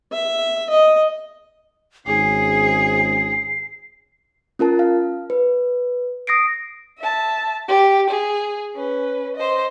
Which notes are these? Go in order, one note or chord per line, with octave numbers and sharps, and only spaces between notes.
E5
D#5
G#1 G#2 C#4 G#4 C7
C#4 F4 A#4 A5
F5
B4
D#6 A#6 C7 D7
E5 A5
G4
G#4
C#4 B4
C5 D#5